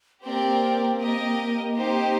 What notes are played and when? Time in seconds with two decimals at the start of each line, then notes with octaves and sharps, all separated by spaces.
0.25 A#3 C4 G4 A#4 D5 G5
0.99 G4 A#4 D#5
1.74 C4 D#4 G4 C5